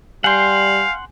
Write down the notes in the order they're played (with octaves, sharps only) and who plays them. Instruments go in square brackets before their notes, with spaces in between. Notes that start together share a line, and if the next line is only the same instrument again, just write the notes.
[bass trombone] G3 [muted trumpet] F5 [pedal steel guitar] F#5 C6 [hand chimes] G#5 G6